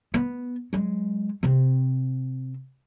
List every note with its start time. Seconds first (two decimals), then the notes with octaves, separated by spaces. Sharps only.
0.14 B3
0.73 F#3 G#3
1.43 C3 C4